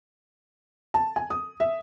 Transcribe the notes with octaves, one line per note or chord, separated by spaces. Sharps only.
A5
G#5
D#6
E5